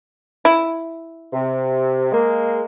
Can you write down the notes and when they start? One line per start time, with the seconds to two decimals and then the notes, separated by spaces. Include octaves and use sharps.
0.45 E4
1.32 C3
2.12 G#3 A#3